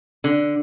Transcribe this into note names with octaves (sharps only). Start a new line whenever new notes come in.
D3